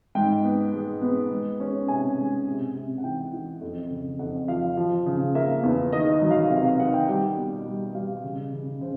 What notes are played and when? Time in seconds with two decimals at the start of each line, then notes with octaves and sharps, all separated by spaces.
0.15 G#2 G5
0.44 B3
0.73 G#3
1.02 B3
1.30 G#3
1.60 C#4
1.88 C3 G#5
2.17 G#3
2.46 C3
2.75 C3
2.98 F#5
3.03 E3 G5
3.33 E3
3.61 F2
3.90 C#3
4.19 F2 F#5
4.48 F3 F5
4.77 F3
5.06 C#3
5.35 A#3 E5
5.63 E2
5.92 D#3 D#5
6.12 D#5
6.22 F#3
6.31 F5
6.50 C3 F5
6.65 F5
6.79 D#3 F#5
6.94 G5
7.08 G3 G5
7.37 B2
7.66 G3
7.95 G3 F5
8.23 C#3
8.52 C#3
8.81 C#3 C5